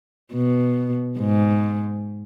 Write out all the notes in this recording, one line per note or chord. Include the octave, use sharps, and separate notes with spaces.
B2
G#2